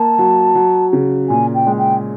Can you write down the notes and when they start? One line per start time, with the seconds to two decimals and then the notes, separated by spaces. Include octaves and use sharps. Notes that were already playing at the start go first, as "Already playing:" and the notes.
Already playing: A#3 A5
0.19 F#3
0.55 F#3
0.93 C#3
1.29 A#2 G#5
1.54 G5
1.67 G#3
1.78 G5